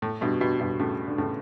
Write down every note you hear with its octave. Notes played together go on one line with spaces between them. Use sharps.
A2
G2 B2
G2 B2
G2 B2
A2 C#3
D3
A2 C#3